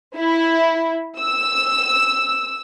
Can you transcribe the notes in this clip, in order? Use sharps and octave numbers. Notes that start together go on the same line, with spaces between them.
E4
E6